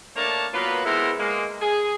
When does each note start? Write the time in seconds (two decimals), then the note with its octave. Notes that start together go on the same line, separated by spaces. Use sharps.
0.16 A3 A#3 D4 A#4 C#5 A5
0.53 F#3 A#3 B3 F4 B4
0.85 G#3 B3 E4 A4 A#4 C5
1.19 G#3 A#3
1.61 G#4